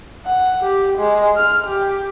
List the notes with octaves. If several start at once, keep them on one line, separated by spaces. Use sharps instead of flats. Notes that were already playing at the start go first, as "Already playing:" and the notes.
F#5
G4
G#3
F6
G4